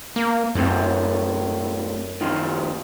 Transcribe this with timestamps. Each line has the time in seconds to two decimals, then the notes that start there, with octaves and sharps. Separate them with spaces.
0.16 A#3
0.55 B1 F#2 A2 C3
2.21 D#2 D#3 F3